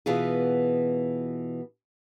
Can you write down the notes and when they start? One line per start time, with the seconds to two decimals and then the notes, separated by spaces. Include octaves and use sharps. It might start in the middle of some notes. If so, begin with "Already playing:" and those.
0.06 B2 E3 B3 F4 G#4